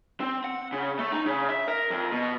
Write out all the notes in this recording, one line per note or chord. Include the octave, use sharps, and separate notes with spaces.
C4
F#5
C#3
A3
D#4
C#3
E5
A#4
F2
B2